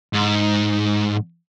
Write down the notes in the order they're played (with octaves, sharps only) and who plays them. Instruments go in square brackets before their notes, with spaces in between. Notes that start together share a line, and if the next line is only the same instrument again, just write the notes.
[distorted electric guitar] G#2